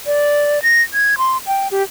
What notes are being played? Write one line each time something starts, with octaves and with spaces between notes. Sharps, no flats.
D5
A#6
G#6
C6
G5
G4